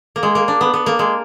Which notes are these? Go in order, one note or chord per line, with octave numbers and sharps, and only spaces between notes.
A#3
G#3
A#3
D4
B3
B3
A#3
G#3